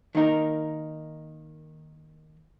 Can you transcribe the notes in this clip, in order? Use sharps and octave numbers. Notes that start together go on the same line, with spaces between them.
D#3 A#3 D#4 A#4